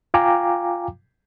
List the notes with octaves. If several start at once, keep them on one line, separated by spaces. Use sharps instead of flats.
F4 F5 G5 G#5 A#5 D6